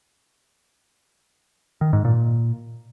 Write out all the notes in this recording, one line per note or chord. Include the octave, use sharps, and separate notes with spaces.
D#3
G#2
A#2